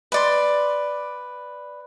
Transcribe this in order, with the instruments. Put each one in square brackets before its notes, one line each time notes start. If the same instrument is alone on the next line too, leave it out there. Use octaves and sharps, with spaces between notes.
[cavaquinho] B4 D5 C6